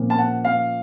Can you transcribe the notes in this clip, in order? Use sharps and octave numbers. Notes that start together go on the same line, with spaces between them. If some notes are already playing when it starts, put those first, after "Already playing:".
Already playing: A#2 F3 A#3 C#4
A5
F#5
F5